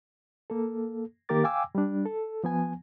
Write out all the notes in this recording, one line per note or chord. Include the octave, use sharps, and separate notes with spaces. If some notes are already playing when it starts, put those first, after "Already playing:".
A#3 A4
D#3 A#3 G4 A#4 D6 A6
F5 G5 G#5 D6 E6
G3 D4
A4
F3 B3 G#5